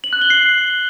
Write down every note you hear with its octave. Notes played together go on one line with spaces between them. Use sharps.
F#7
F#6
G7
C7